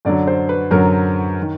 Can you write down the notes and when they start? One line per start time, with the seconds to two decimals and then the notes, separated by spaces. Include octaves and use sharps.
0.05 F#2 D3 F#3 D5
0.27 C5
0.49 B4
0.71 F#2 D3 F#3 A#4
1.42 D#3